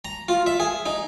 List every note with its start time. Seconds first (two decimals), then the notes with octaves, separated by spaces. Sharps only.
0.05 A#5
0.29 F4
0.47 E5
0.60 G#4
0.86 D#4